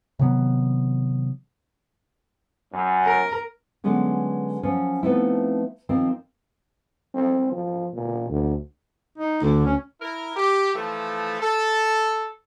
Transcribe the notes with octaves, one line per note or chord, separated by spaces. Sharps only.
C3 D#3 F#3 B3
F#2
A#4
D3 F#3 G#3 B3 C#4
F3 F#3 A#3 C#4
F3 A3 B3 C4 D#4 E4
D#3 F3 A#3 C4
C4
F3
A#2
D2
D#4
D2 D3
C#4
E4 A#4
G4
E3 F3 A3
A4